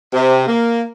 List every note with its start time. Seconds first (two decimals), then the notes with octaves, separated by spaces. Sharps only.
0.13 C3
0.47 A#3